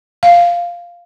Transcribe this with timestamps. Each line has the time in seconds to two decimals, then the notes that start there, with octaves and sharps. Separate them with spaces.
0.23 F5